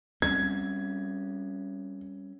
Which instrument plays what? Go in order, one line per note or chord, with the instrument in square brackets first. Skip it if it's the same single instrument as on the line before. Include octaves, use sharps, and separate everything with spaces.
[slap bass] G3 C4 C#4 [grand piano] G#6